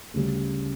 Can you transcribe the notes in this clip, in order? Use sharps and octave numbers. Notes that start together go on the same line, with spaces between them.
D2 C#3 G3